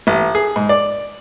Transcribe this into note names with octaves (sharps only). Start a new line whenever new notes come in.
A1
G#4
G#2
D5